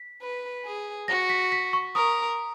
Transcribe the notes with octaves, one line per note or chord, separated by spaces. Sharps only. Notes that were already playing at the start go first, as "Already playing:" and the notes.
Already playing: B6
B4
G#4
F#4 A#6
B6
B6
C#6
A#4 D#6